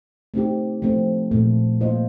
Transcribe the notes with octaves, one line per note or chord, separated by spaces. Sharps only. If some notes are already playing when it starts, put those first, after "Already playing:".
A3 C4 D#4 G4
F3 A3 C4
A#2 F3 A3
A#3 F4 C5 D#5